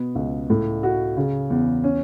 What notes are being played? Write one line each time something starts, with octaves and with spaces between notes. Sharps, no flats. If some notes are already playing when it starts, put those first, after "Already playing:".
Already playing: B2 B3
C#2
A2
F#4
C#3
E2
C#4